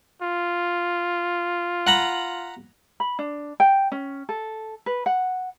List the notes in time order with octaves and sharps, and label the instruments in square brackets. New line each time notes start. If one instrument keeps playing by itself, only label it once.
[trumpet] F4
[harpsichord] F#5 A#5 B5
[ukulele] B5
D4
G5
C#4
A4
B4
F#5